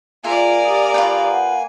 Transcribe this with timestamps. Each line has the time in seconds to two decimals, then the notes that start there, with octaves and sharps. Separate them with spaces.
0.24 A#3 F4 G#4 A#4 D5 E5 G#5 C6
0.65 G4 A#5 D#6
0.94 F4 B4 G5
1.30 F#5